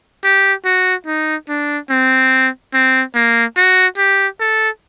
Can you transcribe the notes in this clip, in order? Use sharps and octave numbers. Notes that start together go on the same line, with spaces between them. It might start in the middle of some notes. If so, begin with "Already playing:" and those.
G4
F#4
D#4
D4
C4
C4
A#3
F#4
G4
A4